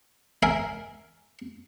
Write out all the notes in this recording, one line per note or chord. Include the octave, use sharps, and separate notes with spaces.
A#4 E5 G#5